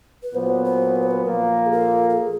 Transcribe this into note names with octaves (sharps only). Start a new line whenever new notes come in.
B4
A#2 F#3 B3 C5
C5
B4
C5
B4
A#2 F3 A#3 A#4
G#4
A4
A4
G#4